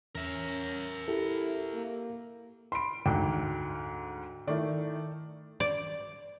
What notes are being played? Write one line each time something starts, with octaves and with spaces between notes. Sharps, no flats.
E2 C#4 A#4 E5
E4 G4 A4
A#3
B5 C6 D7
D2 G#2 G5
D#3 A3 E4 D5
D5